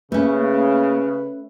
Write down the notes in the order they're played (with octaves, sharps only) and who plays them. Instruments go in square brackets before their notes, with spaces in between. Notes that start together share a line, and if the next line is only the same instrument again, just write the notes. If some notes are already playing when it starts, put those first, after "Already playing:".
[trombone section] C#3 [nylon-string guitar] A3 C#4 [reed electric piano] A#3 [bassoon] B4